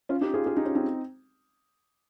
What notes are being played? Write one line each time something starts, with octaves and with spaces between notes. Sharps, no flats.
C#4 F4
D#4 G4
F4 G#4
F4 G#4
D#4 G4
C#4 F4
C4 D#4